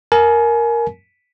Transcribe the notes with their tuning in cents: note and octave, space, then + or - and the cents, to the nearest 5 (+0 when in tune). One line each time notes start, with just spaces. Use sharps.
A#4 +0 G#5 +30